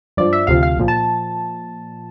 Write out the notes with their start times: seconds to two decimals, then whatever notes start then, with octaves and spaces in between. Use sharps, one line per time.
0.17 G2 F3 D5
0.33 E5
0.47 D2 C3 F3 F5
0.63 F5
0.77 C2 A#2 F3
0.88 A5